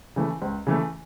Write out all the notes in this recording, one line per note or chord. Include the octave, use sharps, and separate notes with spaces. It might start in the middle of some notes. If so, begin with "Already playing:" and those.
C#3 E3 A3
C#2
C#3 E3 A3